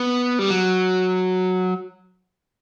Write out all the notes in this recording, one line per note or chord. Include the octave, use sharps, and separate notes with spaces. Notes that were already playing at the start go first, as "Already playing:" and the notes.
Already playing: B3
G3
F#3